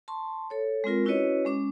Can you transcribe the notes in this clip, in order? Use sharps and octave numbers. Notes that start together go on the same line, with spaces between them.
A5 C6 C#6
A4 C#5
G#3 C4 F4 A#4
C#4 E4 F#4 B4 C#5 D#5
G#3 C#4 D6